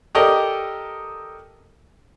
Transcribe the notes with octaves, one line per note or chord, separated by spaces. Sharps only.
G4 A4 A#4 D5 D#5